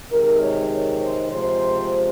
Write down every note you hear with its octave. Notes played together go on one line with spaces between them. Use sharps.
C3 D#3 G#3 A#4
C#5
C#5
C5
C3 F3 G#3 C5